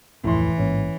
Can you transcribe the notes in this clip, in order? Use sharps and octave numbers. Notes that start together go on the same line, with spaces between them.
D1 F2 A2 E3 C6
A1 G#2 A#3 C#4